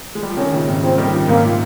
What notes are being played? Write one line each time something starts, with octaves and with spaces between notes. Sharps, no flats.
G#3
G3
F3
C3 D#3 C#4
A#2 C#3
G#2 C3
A#2 C#3 C4
D#3 G3
C#3 F3
G#2 C3 A#3
A#2